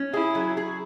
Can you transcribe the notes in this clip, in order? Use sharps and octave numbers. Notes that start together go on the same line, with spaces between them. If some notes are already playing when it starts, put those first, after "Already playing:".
Already playing: C#4
E4 G#4
F#3
G#4